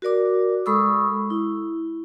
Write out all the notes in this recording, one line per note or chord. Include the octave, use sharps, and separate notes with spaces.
F#4 A#4 D5 D6
G#3 A4 B5 C#6 D#6 E6
E4